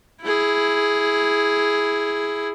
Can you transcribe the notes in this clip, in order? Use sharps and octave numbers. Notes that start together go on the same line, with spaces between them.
E4 G#4